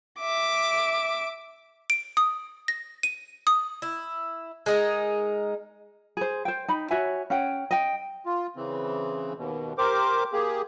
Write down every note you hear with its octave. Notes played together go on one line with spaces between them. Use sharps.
E5 D6
D7
D#6
A#6
D#7
D#6
E4
G#3 D#4 A#4
G#4 C5
C5 G5
D#4 B5
F#4 C#5 E5 G#5
C#4 F#5 G5
D#5 G5
F4
C#3 E3 C4
D#2 B2
G4 A#4 C5 D6
A#3 G4 G#4